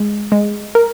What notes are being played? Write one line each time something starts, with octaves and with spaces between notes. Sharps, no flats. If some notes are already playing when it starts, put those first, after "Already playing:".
Already playing: G#3
G#3
A#4